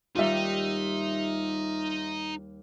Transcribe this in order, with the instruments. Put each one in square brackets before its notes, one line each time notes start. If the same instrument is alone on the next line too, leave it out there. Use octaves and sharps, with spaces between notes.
[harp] D#2 G3 [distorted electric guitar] D#4 [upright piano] F4 E5